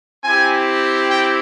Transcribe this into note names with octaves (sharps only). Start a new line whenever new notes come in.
C4 E4 G4 G#5
G5